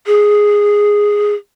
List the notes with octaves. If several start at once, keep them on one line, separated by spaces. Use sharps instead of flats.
G#4